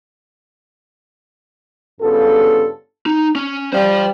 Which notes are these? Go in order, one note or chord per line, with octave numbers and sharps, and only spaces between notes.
G2 C#3 B3 F4 A4
D#4
C#4
G3 C5 F5